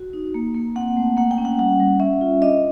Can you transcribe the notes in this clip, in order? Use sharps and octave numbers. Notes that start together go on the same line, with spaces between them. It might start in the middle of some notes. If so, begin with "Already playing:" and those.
Already playing: F#4
D#4
A#3
A#3
C4 F#5
A3
A#3 F#5
G5
C#4
F#5
G3 F#5
G3
C#4 E5
F4
D4 D#5